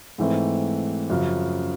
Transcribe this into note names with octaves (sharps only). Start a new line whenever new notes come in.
G#2 E3 A3 C4
F#2 C#3 F3